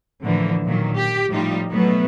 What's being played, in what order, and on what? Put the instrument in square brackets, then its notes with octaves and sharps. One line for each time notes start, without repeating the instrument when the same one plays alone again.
[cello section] A2 D3 E3 F3 A#3
A#2 D#3 F#3
G4
A2 F3 G3 D#4 F4 G4
B2 F#3 A3 B3